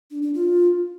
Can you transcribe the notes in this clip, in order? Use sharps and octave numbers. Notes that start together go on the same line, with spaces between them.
D4
D4
F4